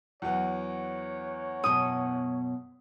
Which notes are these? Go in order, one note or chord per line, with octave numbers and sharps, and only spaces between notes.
E2 F#3 B3 C#5
F#2 B2 D#6